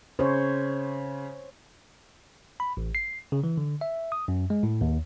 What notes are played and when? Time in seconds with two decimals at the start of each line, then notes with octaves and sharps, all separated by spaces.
0.19 C#3 C5 C#5
2.60 B5
2.77 A1
2.95 C7
3.32 C#3
3.44 E3
3.58 D3
3.81 E5
4.12 D#6
4.28 F#2
4.50 G#3
4.63 A2
4.81 D#2